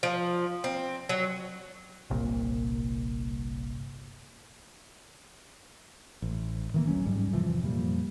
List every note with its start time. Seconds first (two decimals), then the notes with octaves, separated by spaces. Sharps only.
0.03 F3
0.64 C4
1.09 F#3
2.10 G1 C2 A#2
6.22 A1
6.74 D#3 E3 A#3
6.87 D#1 F#3 C#4
7.06 G#2 G3
7.32 E1 C3 E3 F3
7.62 F2 A#2 G3